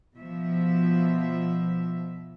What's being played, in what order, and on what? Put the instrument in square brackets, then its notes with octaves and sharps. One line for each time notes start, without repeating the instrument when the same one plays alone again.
[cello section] B2 F3 E5